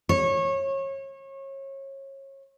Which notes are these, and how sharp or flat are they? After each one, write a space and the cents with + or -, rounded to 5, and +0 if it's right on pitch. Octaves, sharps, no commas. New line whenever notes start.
C#5 -30